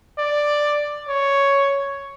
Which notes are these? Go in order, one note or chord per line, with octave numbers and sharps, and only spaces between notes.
D5
C#5